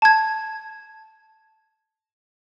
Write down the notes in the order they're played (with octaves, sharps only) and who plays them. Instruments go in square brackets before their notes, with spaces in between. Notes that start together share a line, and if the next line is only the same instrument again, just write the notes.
[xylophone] A5 G#6